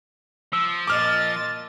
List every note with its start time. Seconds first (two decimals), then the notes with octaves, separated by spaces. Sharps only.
0.53 F3 E6
0.87 A#2 D#5 D6 F6 A6